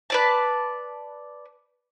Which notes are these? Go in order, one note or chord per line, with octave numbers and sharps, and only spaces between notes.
B4 D5 A5